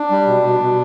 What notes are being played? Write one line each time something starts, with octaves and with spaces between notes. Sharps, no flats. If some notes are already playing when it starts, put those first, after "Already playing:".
Already playing: D4
G3
B2
B2
B2